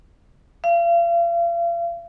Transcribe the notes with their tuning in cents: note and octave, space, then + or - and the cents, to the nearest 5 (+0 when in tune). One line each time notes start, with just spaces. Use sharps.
F5 -40